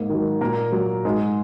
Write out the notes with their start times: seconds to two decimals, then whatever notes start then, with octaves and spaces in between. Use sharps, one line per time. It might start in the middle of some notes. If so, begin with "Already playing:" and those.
Already playing: G#2 A#3 A#4
0.09 D#3 F#3
0.41 A#2 A#3 A#4
0.72 F#3
1.05 G#2 G#3 G#4